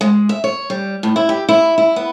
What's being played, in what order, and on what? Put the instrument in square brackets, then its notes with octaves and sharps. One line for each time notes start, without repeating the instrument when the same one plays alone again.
[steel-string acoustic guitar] G#3
E5
C#5
G3
A2
E4
G4
E4
E4
B3